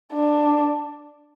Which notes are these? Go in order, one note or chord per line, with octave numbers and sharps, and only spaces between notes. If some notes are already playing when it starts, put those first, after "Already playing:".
D4